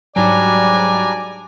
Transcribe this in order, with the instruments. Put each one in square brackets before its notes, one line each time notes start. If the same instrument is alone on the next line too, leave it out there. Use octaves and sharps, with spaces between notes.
[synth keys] G#2 F#3 [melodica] G3 D4 A#5 [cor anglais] D5 [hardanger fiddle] G#5